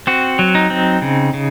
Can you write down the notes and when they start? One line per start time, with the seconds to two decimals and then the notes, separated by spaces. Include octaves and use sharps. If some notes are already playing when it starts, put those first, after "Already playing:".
0.07 C4 F#4
0.39 F#3
0.55 D#4
0.70 C4
1.02 C#3
1.34 C#3